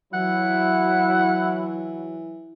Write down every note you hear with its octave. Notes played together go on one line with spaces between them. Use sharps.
E3 F#3 E4 F#5